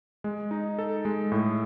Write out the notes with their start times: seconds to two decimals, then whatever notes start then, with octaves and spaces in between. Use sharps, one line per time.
0.24 G#3
0.51 D#4
0.79 A4
1.05 G#3
1.32 A2